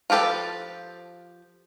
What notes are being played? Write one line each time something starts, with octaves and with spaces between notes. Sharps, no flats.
F3 F4 G4 A4 B4